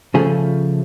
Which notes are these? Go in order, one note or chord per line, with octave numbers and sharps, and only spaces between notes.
C#3 F3 A3 G#4